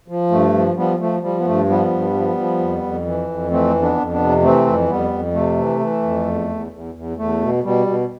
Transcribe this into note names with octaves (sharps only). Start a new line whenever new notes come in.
F3
G2 A3
F3
F3 G3 B3
F3 A3
F3 G3
B3
G2 A3
F3 G3 B3
G2
F3
F3
F2
F2
E3
F2
E3 A3 C4
F2
B3 D4
F2
B3 D4
C3
E3 A3 C4
F2
F2 G3 B3
F2
C3 A3
E3
E3
F2
E2
E2
E2
E2
E2 A3
B2
B2 G3
B2